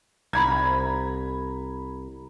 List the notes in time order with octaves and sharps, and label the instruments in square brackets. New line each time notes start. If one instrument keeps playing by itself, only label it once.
[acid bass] C2 [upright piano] A#5 B5 G#6